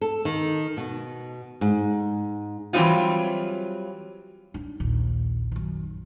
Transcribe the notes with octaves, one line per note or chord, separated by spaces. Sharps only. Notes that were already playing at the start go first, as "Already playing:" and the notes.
A4
D#3
B2
G#2
E3 F#3 G3 C4 D#4 F4
D4 D#4
A#1 D#2
F#2 D#3